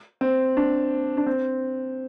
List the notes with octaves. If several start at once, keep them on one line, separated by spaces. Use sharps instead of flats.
C4
D4
D4
C4